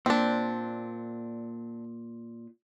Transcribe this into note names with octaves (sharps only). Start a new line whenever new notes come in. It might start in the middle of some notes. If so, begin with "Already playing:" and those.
A#2 C4 D4